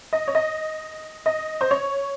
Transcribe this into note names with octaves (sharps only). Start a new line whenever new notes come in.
D#5
C#5
D#5
D#5
C5
C#5